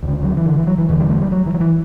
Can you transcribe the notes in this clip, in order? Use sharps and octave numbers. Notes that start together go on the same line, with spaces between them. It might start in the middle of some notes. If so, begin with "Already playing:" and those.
D2 C#3
F#3
E3
D3
E3
F#3
E3
E2 D3 E3
G3
A3
G3
F#3
E3
F#3
E3